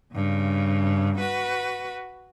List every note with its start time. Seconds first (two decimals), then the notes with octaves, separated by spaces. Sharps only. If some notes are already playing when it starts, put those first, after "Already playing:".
0.14 G2 C#3
1.18 F#4 B4